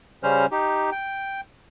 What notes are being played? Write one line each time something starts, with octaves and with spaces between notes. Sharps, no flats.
C#3 G3 C#4 C5 F6
D#4 G4
G5